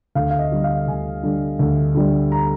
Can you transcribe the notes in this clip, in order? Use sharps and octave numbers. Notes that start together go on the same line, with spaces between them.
D2 F5
F5
D#5
D3 G3
F5
D2 G#5
D3 G3
D2
D3 G3
A#5